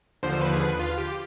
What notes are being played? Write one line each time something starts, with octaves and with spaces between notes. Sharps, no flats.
D#2 D3 F3 C5
B4
G#4
B4
F4
G4